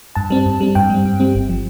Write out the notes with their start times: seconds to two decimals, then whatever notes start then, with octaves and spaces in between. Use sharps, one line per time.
0.15 G2 A5
0.30 G3 C4
0.46 G2
0.61 G3 C4
0.75 G2 G5
0.90 G3 C4
1.05 G2
1.20 G3 C4
1.35 G1
1.49 F3